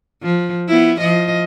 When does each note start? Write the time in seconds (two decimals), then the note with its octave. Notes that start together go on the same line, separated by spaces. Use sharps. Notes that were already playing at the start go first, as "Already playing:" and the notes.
0.23 F3
0.68 B3 E4
1.00 F3 D#5